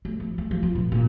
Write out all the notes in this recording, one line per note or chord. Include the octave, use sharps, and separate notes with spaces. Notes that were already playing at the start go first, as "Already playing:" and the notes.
A3
F3
A3
F3
F4
A#1
A#2